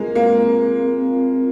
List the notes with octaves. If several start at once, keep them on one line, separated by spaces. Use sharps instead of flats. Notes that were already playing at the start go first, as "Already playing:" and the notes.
Already playing: G#3 A#3 C4 F4 G#4
A#3 C4
C4
C4
F4